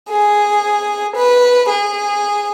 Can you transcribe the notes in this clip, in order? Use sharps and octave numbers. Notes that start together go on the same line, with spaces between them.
G#4
B4
G#4